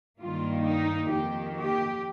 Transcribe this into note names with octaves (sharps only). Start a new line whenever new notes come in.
G2 D#3 G3 A#3 F4
D#4
F2 D#3 A#3 G4
G4